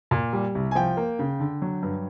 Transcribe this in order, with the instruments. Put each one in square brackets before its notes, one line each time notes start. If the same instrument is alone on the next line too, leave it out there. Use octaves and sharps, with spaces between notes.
[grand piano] A#2
G3
C2
G#5
F3 G5
A#3
C#3
D3
F#3
G2